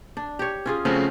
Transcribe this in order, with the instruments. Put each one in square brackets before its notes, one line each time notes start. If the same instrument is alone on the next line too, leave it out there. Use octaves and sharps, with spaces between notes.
[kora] D4
G4 C#5
C#4 F4 G#4
[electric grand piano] C#3 A3 C4 [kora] F3 C#4 F#4